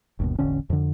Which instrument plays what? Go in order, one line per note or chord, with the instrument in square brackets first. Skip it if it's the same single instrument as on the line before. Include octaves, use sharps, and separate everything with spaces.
[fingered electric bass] G1 D#2 B2
E1 A1 D3 C#4
F2 D3